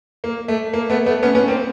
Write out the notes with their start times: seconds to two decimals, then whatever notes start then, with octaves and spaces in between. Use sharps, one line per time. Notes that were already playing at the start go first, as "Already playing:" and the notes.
0.24 A#3
0.48 A3
0.73 A#3
0.90 A3 B3
1.06 A3 B3
1.23 B3 C#4
1.35 B3 C#4
1.48 A#3 C4